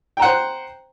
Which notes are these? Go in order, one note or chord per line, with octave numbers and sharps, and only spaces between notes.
C5 F#5 G5 A#5